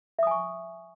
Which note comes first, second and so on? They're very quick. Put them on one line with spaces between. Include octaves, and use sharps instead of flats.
E5 D#6 G#5 C#6